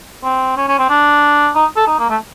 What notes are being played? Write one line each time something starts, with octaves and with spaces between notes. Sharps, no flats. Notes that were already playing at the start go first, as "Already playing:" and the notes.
C4
C#4
C#4
C4
D4
D#4
A4
D#4
A#3
A3